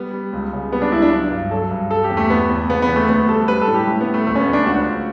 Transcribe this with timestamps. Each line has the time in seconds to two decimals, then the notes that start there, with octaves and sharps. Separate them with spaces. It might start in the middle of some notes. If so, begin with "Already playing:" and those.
Already playing: G3 B3
0.13 G3
0.33 C#2
0.53 C#3
0.72 G3 B3
0.82 D4
0.92 C#2 E4
1.02 D4
1.12 F#3
1.32 G2
1.51 F#3 A4
1.71 G2
1.91 G3 A4
2.04 G4
2.10 E2
2.17 A3
2.30 E2 B3
2.49 E2
2.70 C#3 B3
2.82 B3
2.89 E2
2.96 A3
3.09 D2 B3
3.28 G3 A4
3.48 G3 B4
3.61 A4
3.67 A2
3.74 G4
3.87 A2
4.01 B3
4.07 G3
4.14 A3
4.27 D2 A3
4.36 C#4
4.40 B3
4.47 D2
4.53 D4
4.66 C#2 F#4
4.86 C#2